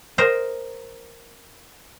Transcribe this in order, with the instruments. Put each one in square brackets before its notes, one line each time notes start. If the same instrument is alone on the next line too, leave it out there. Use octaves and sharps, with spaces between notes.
[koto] A#4 C5 D#5